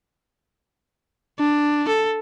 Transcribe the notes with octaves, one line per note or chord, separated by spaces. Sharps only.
D4
A4